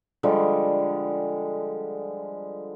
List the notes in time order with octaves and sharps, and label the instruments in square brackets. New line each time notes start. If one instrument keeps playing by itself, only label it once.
[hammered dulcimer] D3 F3 G3 G#3